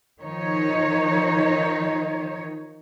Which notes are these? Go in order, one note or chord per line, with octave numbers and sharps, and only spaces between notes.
D#3 F3 D#4 C#5